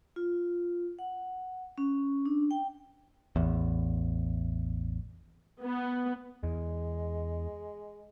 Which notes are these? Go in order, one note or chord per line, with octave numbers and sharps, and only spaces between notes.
F4
F#5
C#4
D4
G5
A1 E2
B3
E2 E3 G#3